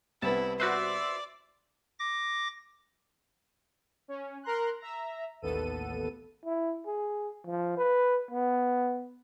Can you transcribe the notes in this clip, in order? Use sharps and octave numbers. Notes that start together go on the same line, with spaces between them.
C2 B3 E4 A5
F#4 B4 C5 D5 E5 C6 E6
D6 A#6
C#4
A#4 A#5 C6 F#6
E5 A#5
A1 D#2 B3 A4 D#7
E4
G#4
F3
B4
B3